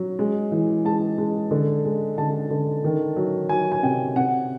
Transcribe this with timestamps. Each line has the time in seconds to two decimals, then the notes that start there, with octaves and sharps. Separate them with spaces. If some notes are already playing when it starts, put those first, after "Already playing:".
Already playing: F#3
0.19 G#3
0.52 E3
0.85 G#3 A5
1.18 G#3
1.51 D3
1.85 G#3
2.18 D3 A5
2.50 D3
2.84 D#3
3.16 F#3
3.49 F#3 G#5
3.72 G#5
3.83 C3 G5
4.16 C3 F#5